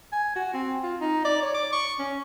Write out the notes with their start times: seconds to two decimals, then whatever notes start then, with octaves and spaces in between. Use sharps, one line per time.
0.12 G#5
0.36 F#4
0.54 C4
0.83 F4
1.01 D#4
1.25 D5
1.42 C#5
1.54 D6
1.72 C#6
1.99 C#4